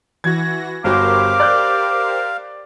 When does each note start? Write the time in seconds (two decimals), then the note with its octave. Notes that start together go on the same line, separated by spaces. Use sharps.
0.24 E3 F#4 G#6 A#6
0.84 G1 F#4 G4 A#4 C5 F5 D6
1.40 D5 F#6 G6